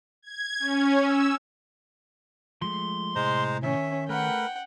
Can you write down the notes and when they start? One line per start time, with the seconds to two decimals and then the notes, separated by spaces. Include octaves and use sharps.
0.22 G#6
0.60 C#4
1.01 E6
2.62 F3 G#3 A3 C6
3.15 A2 C3 G#3 E4 C5 A#5
3.63 D#3 C#4 E5
4.09 A3 A#4 B4 F#5 G5